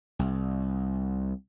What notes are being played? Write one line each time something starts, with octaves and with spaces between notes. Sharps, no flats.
C2